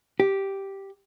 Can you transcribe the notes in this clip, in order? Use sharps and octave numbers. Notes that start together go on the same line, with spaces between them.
G4